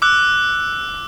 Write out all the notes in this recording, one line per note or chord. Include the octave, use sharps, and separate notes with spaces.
D6 E6 F#6